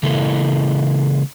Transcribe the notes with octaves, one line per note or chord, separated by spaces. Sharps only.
C#3 E3 G#3 A#3 E4 A4